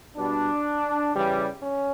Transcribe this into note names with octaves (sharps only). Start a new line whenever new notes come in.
B2 G3 D4
C#3 E3 G3
C#4